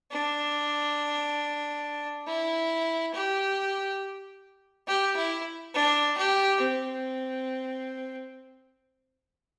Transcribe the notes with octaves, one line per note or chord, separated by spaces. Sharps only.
D4
E4
G4
G4
E4
D4
G4
C4